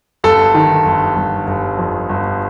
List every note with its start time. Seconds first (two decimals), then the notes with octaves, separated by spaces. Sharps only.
0.24 G1 A4
0.54 D#3
0.86 G1
1.16 G1
1.47 G1
1.78 F2
2.09 G1